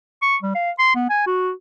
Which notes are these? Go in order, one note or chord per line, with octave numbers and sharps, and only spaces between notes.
C#6
G3
F5
C6
B3
G#5
F#4